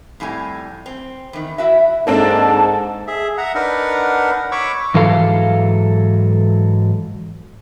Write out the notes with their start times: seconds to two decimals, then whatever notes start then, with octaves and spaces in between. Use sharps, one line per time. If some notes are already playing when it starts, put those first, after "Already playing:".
0.20 F2 A2 G3 G#5
0.86 C4
1.33 E2 D#3
1.58 E4 F#4 E5
2.07 G#2 A#3 C4 D4 A4 A5
3.07 G#4 E5
3.38 E5 F#5 A#5
3.55 D4 D#4 A#4 B4 F#5
4.52 C#5 B5 C#6 D6 E6
4.94 G#2 E3 F#3 A4 F5